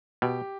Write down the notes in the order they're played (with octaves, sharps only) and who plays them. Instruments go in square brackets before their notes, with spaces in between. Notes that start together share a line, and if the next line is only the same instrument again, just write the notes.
[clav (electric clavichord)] B2 [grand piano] G4